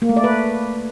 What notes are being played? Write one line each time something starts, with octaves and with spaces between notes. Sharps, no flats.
A#3
A3
D5
B4